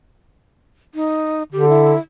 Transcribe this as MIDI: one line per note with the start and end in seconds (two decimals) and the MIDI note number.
0.95 1.43 63
1.53 1.94 50
1.53 1.69 67
1.69 1.99 64